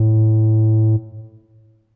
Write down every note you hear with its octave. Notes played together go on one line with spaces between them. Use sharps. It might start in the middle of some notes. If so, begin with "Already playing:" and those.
Already playing: A2